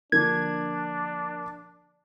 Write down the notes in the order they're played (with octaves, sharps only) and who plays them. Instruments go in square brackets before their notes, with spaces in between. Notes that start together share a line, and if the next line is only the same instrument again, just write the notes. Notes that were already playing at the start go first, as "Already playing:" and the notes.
[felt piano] D3 F3 A#3 [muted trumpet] D4 [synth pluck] G#6